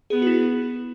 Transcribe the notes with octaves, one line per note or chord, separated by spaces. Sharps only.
B3 G#4
F#4
E4